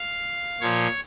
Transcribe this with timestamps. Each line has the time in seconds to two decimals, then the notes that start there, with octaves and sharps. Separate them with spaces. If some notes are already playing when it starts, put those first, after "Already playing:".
Already playing: F5
0.61 A#2 F3 C#5